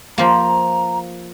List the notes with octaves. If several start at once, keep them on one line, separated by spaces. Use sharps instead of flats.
F3 A#3 A#5